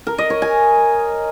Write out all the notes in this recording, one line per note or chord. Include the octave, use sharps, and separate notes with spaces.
A#4
D#5
C#5
G#5